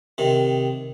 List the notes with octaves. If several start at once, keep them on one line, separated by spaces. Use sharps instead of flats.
C3 D#3